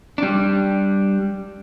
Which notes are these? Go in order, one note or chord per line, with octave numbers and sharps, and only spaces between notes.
G3 D4